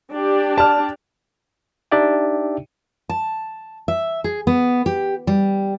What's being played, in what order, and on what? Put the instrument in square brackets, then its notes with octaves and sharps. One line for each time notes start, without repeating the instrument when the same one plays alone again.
[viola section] D4 G4 D5
[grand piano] A5 F6
[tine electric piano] D4 D#4 G4 D5 E5 G5
[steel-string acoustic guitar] A5
E5
G#4
B3
G4
G3